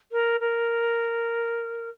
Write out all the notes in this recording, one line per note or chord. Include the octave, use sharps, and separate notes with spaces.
A#4
A#4